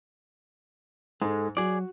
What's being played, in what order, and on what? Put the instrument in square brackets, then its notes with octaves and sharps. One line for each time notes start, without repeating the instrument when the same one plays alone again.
[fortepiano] G#2 [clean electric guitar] G#3 [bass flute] A4
[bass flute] F#3 [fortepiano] F#4 [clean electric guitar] G#4 D5